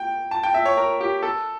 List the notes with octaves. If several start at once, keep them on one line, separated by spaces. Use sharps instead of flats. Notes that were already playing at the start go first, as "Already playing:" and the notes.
Already playing: G5
A5
G5
E5
C#5
A#4
G4
A4